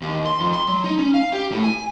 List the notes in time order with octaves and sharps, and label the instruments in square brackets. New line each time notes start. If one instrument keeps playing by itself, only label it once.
[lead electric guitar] D#2
C6
F2
C6
F#3
D#4
C#4
F5
G4
A2
G#5